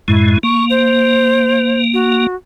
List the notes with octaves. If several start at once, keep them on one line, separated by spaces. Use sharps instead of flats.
F#2 A2 G#3 E4
A#3 C#6
C5
F#4